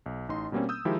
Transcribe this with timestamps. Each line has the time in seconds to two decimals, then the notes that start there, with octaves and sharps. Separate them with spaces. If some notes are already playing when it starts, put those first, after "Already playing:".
0.06 B1
0.29 A1 D#4 C6
0.52 B2 G3 A#3 C4 C#4
0.69 D#6 E6 G6
0.85 D#3 F3 G#3 D#4 E4 G4